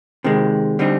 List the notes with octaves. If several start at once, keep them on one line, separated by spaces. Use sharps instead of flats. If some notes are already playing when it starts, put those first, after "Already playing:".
C3 D#3 G#3
D3 G3 C4 D#4